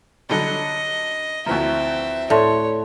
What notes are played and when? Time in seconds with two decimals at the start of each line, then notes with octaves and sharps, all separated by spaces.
0.29 D3 F#3 G3 D#5
1.46 D2 E3 F3 C4 E5 A#5
2.30 A2 C#5 D5 A5 C6